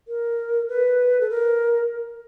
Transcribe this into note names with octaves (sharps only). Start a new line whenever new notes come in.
A#4
B4
A4
A#4